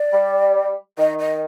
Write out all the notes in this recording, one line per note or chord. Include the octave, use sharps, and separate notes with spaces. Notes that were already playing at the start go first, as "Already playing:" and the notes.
Already playing: D5
G3
D#3 D#5
D#5